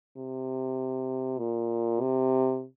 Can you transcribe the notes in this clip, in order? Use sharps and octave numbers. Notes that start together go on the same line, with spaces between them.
C3
A#2
C3